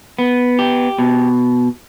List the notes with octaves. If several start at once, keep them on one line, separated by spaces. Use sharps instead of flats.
B3
G4
B2